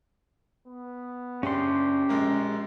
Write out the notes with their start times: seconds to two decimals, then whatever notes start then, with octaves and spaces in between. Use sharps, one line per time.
0.67 B3
1.43 F#1 C#4 D4 G4 C6
2.09 A#1 G#3 A#4